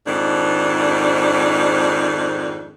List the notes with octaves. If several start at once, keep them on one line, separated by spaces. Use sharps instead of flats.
F2 G#2 D#3 D4